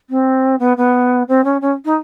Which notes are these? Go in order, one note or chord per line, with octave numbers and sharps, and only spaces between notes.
C4
B3
B3
C4
C#4
C#4
D#4